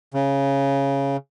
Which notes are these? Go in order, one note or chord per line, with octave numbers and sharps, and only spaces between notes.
C#3